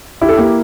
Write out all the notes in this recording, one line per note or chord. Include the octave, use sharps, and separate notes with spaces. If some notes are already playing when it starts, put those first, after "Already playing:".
E4 G4
A4
A#3 G4